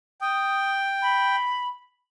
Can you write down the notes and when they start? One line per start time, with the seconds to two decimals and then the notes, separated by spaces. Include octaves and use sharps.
0.21 G5 D#6
1.02 B5